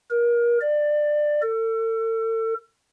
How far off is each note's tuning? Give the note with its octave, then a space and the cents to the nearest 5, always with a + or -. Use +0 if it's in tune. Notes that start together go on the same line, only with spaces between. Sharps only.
A#4 +30
D5 +20
A4 +40